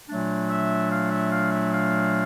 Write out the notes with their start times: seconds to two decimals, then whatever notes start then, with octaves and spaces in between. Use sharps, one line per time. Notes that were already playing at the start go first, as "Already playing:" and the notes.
0.09 A#2 F#3 A3 D4
0.50 E5
0.91 F5
1.11 E5
1.32 F5
1.53 E5
1.74 F5